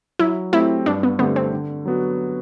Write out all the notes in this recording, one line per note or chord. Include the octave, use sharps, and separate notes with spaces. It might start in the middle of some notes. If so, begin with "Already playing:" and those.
F#3 E4
A3 C4 E4 G4
G2 D4
B3
D3 A3 B3 C4 G4
C4
D3
F#3 B3 F#4